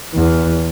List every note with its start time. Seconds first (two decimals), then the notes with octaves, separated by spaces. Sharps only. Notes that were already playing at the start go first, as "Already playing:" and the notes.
0.14 E2